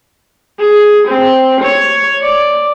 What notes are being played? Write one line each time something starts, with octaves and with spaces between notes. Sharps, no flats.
G#4
C4
C#5
D5